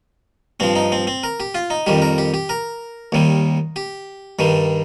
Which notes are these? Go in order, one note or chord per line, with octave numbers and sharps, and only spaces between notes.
G2 F3 C4
D#4
C4
C4
A#4
G4
F4
D#4
F2 D#3 G3 G4
A#4
G4
G4
A#4
D#2 D#3 G3
G4
G2 D#3 G3